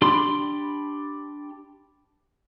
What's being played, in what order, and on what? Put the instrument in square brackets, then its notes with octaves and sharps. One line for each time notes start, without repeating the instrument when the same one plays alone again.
[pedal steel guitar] D4 G4 D5 B5 C6